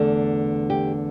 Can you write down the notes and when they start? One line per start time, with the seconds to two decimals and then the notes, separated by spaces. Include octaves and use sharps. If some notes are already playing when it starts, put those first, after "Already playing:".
Already playing: E2 D3 A3 A4
0.70 G4